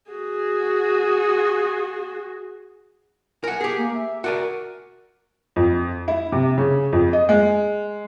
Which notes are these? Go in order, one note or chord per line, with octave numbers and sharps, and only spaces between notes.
F#4 G#4
A#4 F#5 G#5
G4 G#4
A#3
E5
F#4 A#4 D5 G#5
F2
E4
C3
C#3
F2
D#5
G#3